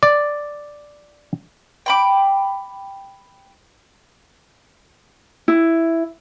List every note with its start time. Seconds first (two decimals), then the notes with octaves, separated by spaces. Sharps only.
0.03 D5
1.86 G5 B5 D6
5.48 E4